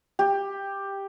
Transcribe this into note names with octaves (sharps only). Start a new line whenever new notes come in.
G4